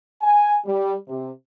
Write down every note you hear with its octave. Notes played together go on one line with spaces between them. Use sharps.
G#5
G3
C3